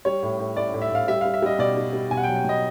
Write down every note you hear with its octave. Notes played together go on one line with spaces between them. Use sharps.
G3 C#5
A2
A2
A2 D5
A2
E5
A2 F5
G3 E5
F5
G3
E5
G3 D#5
B2 D5
G3
G3
B2 G#5
F#5
G5
F#3
G5
B2 D#5